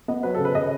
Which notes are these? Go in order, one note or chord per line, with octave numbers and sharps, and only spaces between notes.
B3 D#5
F#3 B4
A4
C#3
B4
C#3 D#5